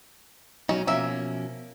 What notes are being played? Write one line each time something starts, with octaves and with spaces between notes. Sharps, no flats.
B2 F#3 C#4 D#4
B2 F3 A#3 C#4 E5